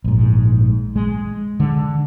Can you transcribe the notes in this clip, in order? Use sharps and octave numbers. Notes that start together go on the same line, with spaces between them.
A#1 G#2
G#3
D3